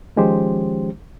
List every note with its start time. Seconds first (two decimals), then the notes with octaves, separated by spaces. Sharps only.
0.16 D#3 F3 G#3 C#4 G4 C5